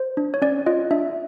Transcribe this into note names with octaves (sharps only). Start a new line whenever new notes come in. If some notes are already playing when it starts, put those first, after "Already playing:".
Already playing: C5
D4
C#5
C#4 D5
F4 D#5
D4 E5